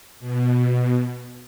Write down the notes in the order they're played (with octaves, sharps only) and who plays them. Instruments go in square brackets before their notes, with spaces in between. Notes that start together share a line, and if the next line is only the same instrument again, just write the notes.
[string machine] B2